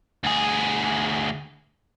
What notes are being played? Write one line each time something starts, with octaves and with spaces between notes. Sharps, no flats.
D2 G#4